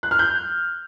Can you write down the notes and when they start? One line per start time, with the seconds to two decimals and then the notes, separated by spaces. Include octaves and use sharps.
0.03 F#6
0.11 F6
0.19 G6